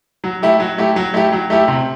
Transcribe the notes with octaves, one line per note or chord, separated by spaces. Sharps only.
F#3
A3 E4 G4
F#3
A3 E4 G4
F#3
A3 E4 G4
F#3
A3 E4 G4
C3